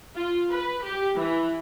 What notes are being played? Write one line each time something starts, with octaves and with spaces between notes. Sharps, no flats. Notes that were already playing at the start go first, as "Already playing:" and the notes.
F4
B4
G4
E3